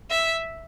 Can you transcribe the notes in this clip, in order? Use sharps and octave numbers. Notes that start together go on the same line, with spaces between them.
E5